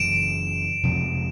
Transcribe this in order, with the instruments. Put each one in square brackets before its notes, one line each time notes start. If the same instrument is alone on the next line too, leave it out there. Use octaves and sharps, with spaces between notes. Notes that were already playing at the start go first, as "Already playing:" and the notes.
Already playing: [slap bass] F#1 F#2 C#3 E3 [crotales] D7 E7
[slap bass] F2 C3 F3 G#3